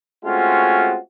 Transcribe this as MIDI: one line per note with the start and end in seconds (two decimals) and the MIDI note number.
0.24 0.96 56
0.24 0.96 57
0.24 0.96 60
0.24 0.96 61
0.24 0.96 65
0.24 0.96 66